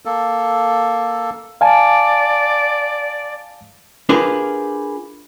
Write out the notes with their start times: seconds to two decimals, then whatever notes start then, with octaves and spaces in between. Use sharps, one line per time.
0.05 A#3 A4
1.61 D5 F5 G#5 A5
4.09 D4 F4 G4 G#4 A#4 B4